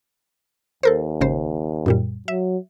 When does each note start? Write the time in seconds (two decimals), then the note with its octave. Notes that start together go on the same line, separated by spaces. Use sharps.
0.83 D#2 A4 A#4 C5
1.21 G#1 C#3 C5
1.86 F#2 A#2 G3
2.28 F#3 E5